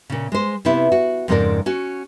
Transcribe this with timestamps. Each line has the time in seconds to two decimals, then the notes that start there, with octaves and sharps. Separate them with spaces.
0.10 A#2 C#3
0.32 G#3 C5
0.65 C3 B3 E4
0.92 F#4
1.28 F2 G#2 C#3 C4 A#4 D5
1.66 C#4 F#4